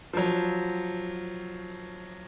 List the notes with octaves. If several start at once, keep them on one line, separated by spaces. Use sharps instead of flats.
F3 F#3